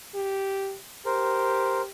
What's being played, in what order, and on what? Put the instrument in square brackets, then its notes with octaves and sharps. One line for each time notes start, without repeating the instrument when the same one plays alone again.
[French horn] G4
[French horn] G4 [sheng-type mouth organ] A#4 C5